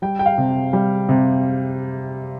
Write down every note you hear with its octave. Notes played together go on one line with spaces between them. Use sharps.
G3 G5
G5
F5
C3
G3
C3